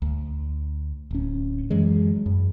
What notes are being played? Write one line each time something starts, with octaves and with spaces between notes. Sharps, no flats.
D2
D1 C#4
F#2 E3 F#3 G#3
F#2